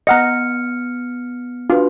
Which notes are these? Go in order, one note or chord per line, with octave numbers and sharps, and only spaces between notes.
B3 D#5 F#5 A#5 F6 C#7
D4 F4 F#4 B4